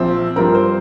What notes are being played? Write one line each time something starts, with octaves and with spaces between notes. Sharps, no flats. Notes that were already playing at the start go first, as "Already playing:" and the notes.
Already playing: A#1 F3 C4
G2 F3 C4 A#4
C5